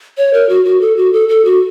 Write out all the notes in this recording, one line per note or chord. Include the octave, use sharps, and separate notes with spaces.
C#5
A#4
F#4
F#4
A4
F#4
A4
A4
F#4